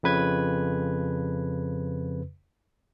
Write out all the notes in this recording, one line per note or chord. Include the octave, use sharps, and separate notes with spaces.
F2 C#3 B4 G#6